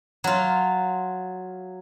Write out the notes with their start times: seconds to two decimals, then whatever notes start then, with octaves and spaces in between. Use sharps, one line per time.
0.24 F#3 F4